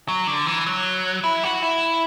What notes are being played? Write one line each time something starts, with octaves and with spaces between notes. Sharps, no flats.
F#3
D3
E3
F#3
E4
F#4
E4